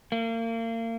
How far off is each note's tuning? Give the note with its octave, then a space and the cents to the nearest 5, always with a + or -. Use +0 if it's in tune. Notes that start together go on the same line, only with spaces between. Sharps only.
A#3 -35